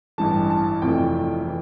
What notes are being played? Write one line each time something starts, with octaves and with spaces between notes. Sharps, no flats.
A1 G2 E3 A5
A5
F1 F2 C3 E3 A3 G5
E3